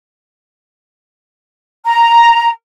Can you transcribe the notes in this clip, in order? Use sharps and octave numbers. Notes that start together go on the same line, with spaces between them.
A#5